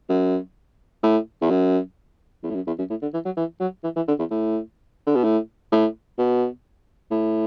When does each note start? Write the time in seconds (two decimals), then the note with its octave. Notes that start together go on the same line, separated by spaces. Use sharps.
0.09 F#2
1.03 A2
1.41 E2
1.50 F#2
2.43 E2
2.50 A2
2.55 F#2
2.67 E2
2.78 F#2
2.90 A2
3.02 D3
3.14 E3
3.25 F#3
3.37 E3
3.60 F#3
3.84 E3
3.96 E3
4.08 D3
4.19 E2
4.31 A2
5.07 D3
5.15 B2
5.24 A2
5.72 A2
6.18 B2
7.11 A2